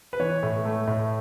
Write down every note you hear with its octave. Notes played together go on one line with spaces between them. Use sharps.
B4
E3 C#5
A2
A3
A2